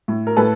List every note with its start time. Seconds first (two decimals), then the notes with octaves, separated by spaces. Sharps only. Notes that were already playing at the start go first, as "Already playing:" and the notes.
0.08 A2
0.27 A#4
0.37 A2 A4 B4